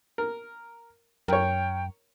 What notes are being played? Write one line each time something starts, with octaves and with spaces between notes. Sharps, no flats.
A#4
F#2 A#4 C#5 G5